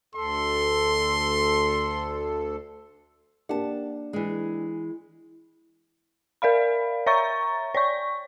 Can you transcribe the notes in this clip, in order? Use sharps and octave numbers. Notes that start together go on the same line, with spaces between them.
D2 A4 C6
A#3 D4 G4 F#5 A5
E3 G#3
A#4 D5 F5 B5
C#5 E5 A#5 C#6 A6
C#5 D5 C#6